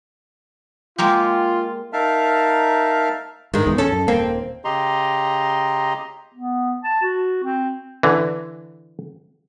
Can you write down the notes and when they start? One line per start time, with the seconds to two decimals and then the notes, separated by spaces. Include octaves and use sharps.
0.98 G#3 A#3 F4 G4
1.93 D#4 A#4 E5 F5 A5 F6
3.54 G2 D#3 G#3
3.67 D#1 E2 E3
3.78 C#4 A4
3.92 F#2
4.08 D#1 A#3 C4
4.65 C#3 G4 D#5 A#5 C6
6.35 B3
6.84 A5
7.02 F#4
7.44 C4
8.03 D3 E3